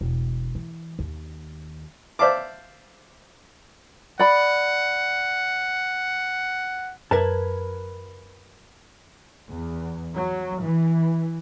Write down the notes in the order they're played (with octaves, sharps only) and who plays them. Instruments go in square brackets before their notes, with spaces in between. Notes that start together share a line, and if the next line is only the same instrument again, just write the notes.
[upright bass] E1
E3
D#2
[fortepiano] C5 D5 E5 F5 A5 D6
[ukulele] D5 B5 [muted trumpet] F#5
[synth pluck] F#2 G#6 [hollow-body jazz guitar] A#4 B4 A5
[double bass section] E2
F#3
E3